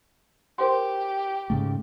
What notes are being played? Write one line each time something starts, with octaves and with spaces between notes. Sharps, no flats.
G4 A#4 C5 C6
G#2 C#3 A3